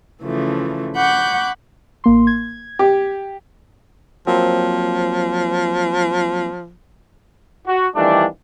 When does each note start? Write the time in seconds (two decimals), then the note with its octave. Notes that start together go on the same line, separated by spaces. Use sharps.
0.22 C#3 E3 F3 A3
0.95 F#5 B5 C#6 D6 F#6 G6
2.04 A1 A#3 C6
2.27 G#6
2.79 G4
4.27 F3 F#3 A#3 C4
7.67 F#4
7.95 F2 D#3 E3 G3 A3 D4